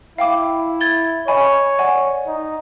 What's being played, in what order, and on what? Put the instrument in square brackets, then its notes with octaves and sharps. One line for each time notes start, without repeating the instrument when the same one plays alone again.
[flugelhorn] E4 [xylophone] F5 G5 D6
[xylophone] G#6 A6 G7
[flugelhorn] C#5 [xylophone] D#5 G#5 B5
[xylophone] D5 F#5 G#5
[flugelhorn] D#4